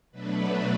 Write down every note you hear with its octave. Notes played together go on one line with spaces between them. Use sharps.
B2 F#3 A3 D4 B4